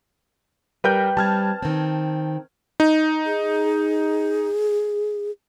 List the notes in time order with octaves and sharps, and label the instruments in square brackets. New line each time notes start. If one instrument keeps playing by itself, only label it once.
[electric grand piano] G3 A#4 G6 [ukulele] B4 G5
[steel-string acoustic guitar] G3 C4 [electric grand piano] A5 F6 G#6
[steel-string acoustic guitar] D#3 C4
[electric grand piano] D#4
[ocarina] G#4